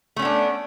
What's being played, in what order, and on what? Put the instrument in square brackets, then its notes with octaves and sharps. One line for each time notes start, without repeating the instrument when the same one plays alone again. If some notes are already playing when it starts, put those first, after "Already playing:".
[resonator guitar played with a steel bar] A3
C#4
B3
D4